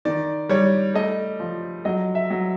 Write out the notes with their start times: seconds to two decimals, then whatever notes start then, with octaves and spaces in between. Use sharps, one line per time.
0.05 D#3 D5
0.49 G3 C#5
0.94 A3 D#5
1.40 F3
1.85 F#3 D#5
2.15 E5
2.30 F#3